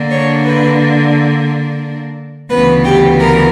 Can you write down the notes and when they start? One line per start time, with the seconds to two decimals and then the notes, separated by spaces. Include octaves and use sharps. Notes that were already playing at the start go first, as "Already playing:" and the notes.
Already playing: D3 A#3 D4
0.10 C#5
0.45 B4
2.50 D2 C#3 E3 B3 B4
2.84 G4
3.19 A#4